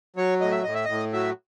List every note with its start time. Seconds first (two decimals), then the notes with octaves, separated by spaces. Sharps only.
0.16 F#3 C#5
0.41 A2 D#5
0.51 E5
0.63 A2 D#5
0.74 E5
0.85 A2 D#5
1.13 F#3 E5